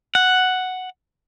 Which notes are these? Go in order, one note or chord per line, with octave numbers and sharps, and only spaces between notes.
F#5